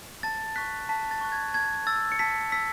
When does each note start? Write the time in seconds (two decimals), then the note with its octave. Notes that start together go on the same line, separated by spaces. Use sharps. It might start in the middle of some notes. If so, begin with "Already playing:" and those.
0.23 A5 A6
0.56 C#6 F#6 B6
0.89 A5 B6
1.11 A6
1.21 C#6 F#6
1.32 G#6
1.54 A5 G#6
1.87 E6 A6
2.12 C#7
2.19 A5 B6
2.52 E6 B6